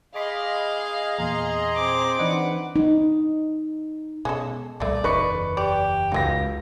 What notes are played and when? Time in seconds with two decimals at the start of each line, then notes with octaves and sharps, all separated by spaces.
0.15 G#4 D#5 F5 B5 C6 D6
1.19 E2 A#2 D#5 A#5 C6
1.75 C4 D6
2.19 E3 D4 D#4 B4 F#5
2.76 D#4
4.25 B2 G#3 C#4 A4
4.80 C2 A#2 G3 A3 A#3 D5
5.04 F#1 E2 D#4 B4 C#6 C#7
5.57 G4 D5
6.12 C#2 F#3 D#4 A#6